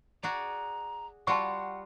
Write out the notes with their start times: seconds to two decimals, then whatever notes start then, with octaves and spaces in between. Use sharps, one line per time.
0.23 F#4 G#4 D5 A#5
1.27 G3 F4 F#4 F#5 A5 C6 C#6